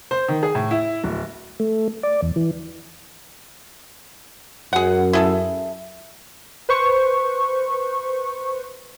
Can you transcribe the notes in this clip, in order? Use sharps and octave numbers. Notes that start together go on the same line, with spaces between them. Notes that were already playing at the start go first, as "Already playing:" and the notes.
C5
D#3
G#4
A2
E4
D1
A3
D5
E2
E3
F#2 G#4 F#5
E4 G#4 A4
B4 C5 C#6